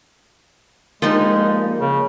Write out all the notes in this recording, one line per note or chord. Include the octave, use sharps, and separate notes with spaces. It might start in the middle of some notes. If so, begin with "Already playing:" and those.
F3 G3 G#3 A#3 D#4
C#3